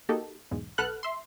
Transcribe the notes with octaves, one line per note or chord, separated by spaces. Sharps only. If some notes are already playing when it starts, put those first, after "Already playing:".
A#3 D#4 F#4 G4 A4
B1 E2 G#2
B1 A4 B4 F#5 F6 F#6
E5 C6